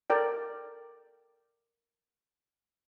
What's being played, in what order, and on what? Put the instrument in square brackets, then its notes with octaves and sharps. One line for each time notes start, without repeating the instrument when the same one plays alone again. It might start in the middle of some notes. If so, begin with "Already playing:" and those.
[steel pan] A4 A#4 D5 G5